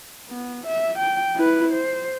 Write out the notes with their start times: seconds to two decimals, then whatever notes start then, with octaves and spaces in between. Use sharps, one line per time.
0.29 B3
0.67 E5
0.99 G5
1.36 E4 B4
1.73 C5